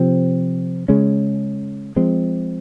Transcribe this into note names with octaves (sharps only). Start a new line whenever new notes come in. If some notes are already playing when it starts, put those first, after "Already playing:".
Already playing: C3 F3 C4
C#3 G#3 C#4
F3 G#3 C4